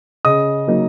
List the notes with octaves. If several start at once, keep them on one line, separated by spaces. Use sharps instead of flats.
C#3 D#5 D#6
F#3 A#3 D#4